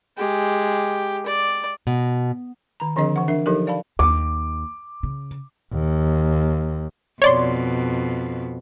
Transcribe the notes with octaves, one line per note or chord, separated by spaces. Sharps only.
G#3 G4
D5
B2
D#3 A#5
D3 F3 C4 D4 G#4 D#5
E3 F#5
D4 A#4 E5
F3 F#3 D#4 G4 A4 A#4
D5 F5 A5 B5
D#2 D6
C#3
D#2
F2 B2 C#5 D5 C6